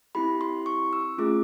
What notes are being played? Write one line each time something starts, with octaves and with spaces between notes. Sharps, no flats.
C4 E4 G4 B5
C6
C#6
E6
A3 C#4 F4 G#4 D6